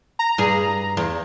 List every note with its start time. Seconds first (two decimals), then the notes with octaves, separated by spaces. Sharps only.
0.19 A#5
0.38 G2 G#4
0.97 E2